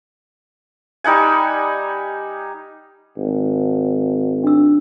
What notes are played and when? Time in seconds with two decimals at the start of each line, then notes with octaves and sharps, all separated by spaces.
1.04 G3 D#4 F#5 G#5
3.17 G#1
4.44 D4 E6